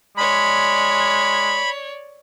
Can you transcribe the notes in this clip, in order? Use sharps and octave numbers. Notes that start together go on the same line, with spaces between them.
G#3 C#5 D5 B5